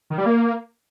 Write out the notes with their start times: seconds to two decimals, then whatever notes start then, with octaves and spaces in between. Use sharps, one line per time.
0.10 D#3
0.18 G3
0.26 A#3